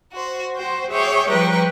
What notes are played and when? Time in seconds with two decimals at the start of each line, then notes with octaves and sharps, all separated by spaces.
0.12 F#4 C5
0.57 F#4 C5 G5
0.90 G#4 C#5 E5 G5 D6
1.28 F3 G3 B4 G5 A#5 C#6